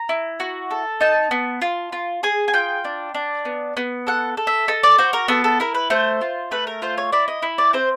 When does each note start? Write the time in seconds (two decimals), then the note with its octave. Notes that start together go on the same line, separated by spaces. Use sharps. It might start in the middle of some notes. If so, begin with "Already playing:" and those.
Already playing: A#5
0.09 E4
0.40 F#4
0.71 A4
1.01 D#4 A5
1.31 B3
1.62 F4
1.92 F4
2.23 G#4 G#5
2.48 G#5
2.54 F4 G5
2.85 D4
3.15 D4
3.45 B3
3.77 B3
4.07 A4 F#5
4.37 A4
4.47 E5
4.68 A4 D#5
4.83 D5
4.98 F#4 C5
5.13 A#4
5.28 B3 A4
5.44 A4
5.60 E4 A#4
5.74 B4
5.90 A3 C5
6.21 F4
6.51 A3 B4
6.67 A#4
6.82 F4 C5
6.98 C#5
7.12 E4 D5
7.28 D#5
7.42 E4
7.58 D5
7.73 C4 C5